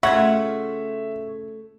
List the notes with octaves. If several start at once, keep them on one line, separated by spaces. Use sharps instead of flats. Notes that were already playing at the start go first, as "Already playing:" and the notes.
C#3 A3 C#4 F4 E5 F#5 C#6 G#6